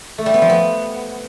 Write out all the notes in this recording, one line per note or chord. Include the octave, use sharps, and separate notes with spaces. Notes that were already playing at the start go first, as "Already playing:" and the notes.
A3
G3
B3
F3
B3